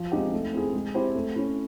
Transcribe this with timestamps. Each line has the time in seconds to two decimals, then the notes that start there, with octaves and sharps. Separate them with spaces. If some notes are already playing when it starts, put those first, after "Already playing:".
Already playing: F3
0.12 G#3 C4 D#4 G4
0.33 A3
0.53 C4 E4 G#4
0.73 G#3
0.94 C4 E4 G4 C5
1.15 A3
1.36 C#4 E4